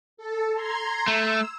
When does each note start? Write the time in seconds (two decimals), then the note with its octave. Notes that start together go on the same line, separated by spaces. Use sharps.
0.17 A4
0.55 A#5 C6 G#6
1.08 A3 E6